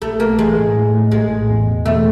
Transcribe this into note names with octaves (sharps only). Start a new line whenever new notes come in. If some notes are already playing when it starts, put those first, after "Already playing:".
A#1 A3
A3 A#3
E3 G#3
A2
A2
A3
A#1 G#3
A2
E2
B2
E2 A3